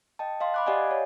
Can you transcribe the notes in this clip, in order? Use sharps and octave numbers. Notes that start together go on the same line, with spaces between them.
D#5 G5 A5
D#5 F5 C6
B5 D6 F#6
G4 D5 D#5 F5 F#5 G#5
C#5